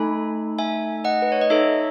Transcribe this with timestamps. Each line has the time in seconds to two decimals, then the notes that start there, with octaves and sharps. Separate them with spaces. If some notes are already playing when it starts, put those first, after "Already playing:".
Already playing: A3 D#4 A4 G#5 B5
0.59 E5 G#5
1.04 D#5 F#5
1.22 B4
1.32 C#5
1.41 D#5
1.50 D#4 A4 C#5 E5